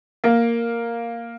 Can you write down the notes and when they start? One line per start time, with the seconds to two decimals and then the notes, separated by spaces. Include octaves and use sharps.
0.24 A#3